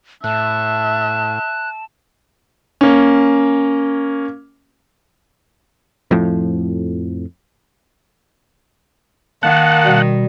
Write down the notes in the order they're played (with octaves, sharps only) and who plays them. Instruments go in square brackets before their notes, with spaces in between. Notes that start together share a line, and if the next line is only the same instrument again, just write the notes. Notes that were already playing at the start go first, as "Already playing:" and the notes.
[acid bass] A2 [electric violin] E5 [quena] A5 [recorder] F#6
[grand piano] A#3 C#4
[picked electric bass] F2 A2 F3
[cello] D#3 [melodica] A#3 A5 [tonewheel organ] F#5
[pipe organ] B2 G3